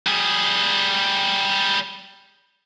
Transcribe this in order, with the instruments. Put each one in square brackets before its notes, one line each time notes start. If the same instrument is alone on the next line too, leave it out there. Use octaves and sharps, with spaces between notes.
[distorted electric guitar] G3 G#4